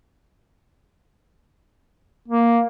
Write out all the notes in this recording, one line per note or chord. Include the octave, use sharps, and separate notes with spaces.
A#3